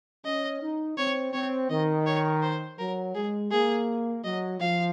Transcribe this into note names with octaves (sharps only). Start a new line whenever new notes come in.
C#4 D#5
D#4
C4 C#5
C4 C#5
D#3 D#5
C#5
C5
F#3 A#4
G#3 G#4
A#3 G#4
F#3 D#5
F3 F5